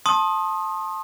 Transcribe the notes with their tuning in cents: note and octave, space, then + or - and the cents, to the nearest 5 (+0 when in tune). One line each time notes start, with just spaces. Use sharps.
A5 +0 C6 +30 D#6 +0